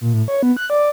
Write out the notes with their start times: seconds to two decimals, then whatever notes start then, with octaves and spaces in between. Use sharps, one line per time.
0.01 A#2
0.14 A2
0.28 C#5
0.43 B3
0.57 F#6
0.70 D5